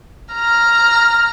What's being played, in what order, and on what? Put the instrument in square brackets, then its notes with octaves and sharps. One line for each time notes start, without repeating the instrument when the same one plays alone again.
[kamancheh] A#5 F6